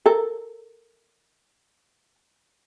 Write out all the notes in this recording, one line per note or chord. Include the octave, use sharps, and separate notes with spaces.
A4 A#4